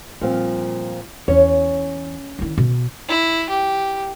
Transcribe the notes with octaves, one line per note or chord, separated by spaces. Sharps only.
A#2 F3 G3 C4
E2 C#4 C#5
D#3 E4
B2
E4
G4